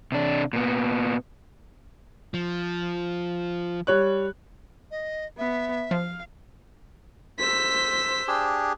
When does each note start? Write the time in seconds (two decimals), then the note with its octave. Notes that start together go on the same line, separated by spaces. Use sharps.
0.12 C3 D4
0.53 A#2 B3
2.34 F3
3.87 G3 C#5 F#6
4.91 D#5
5.38 B3 E5
5.91 F3 F5
7.39 C5 E6 B6
8.28 D4 G4 G#4